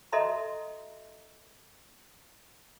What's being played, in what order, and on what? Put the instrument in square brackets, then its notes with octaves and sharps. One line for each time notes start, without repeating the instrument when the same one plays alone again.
[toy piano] F#4 A4 D#5 E5 A#5 C6